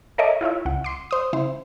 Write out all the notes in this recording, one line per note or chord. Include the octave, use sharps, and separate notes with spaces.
A4 A#4 C#5 D#5 E5 D6
E4 F4 C#5 E5
C#2 F#5
C6 D6
C5 D#6
C#3 E4 C5